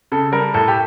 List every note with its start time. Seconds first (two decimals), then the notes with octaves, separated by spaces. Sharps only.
0.12 C#3 A4
0.32 G3 A#4
0.54 A2 A4
0.68 G4